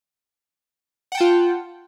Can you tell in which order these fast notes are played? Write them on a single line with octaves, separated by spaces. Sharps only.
F#5 G5 A5 F4